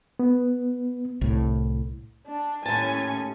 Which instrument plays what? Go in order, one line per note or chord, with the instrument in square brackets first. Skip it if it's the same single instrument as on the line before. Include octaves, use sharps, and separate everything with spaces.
[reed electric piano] B3
[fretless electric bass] C2 A2
[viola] D4
[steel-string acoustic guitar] D#2 A5 [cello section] A2 C#4 [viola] G#5